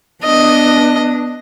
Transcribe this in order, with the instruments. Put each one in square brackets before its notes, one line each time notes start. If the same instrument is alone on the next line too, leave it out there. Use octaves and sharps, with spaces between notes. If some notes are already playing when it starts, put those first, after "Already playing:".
[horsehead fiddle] B3 D4 [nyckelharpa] D#5